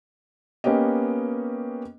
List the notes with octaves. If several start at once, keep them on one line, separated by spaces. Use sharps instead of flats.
A#3 B3 C#4 G4 D#5